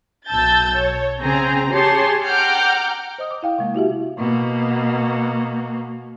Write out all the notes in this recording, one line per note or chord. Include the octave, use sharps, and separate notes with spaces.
B1 A5 E6 G6 A6
C#5
C#3 C4 G#4 A#5
G4 G#4 C#5 A5 C6
F#5 G5 A#5 D6 F6 G6
C5 D#5 D#6
D6
E4 F5 G5
C3 G#3 A#3
E4 F#4 G4 E5
B2 A#3